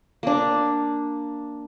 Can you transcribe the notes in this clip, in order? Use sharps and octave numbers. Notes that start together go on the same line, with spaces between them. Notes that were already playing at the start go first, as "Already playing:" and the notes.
A#3 D4